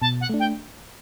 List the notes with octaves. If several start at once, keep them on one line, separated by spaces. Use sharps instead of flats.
B2 A5
F#5
A3 D4
G5